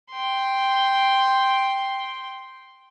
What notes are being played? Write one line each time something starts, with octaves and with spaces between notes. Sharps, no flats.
G5 C6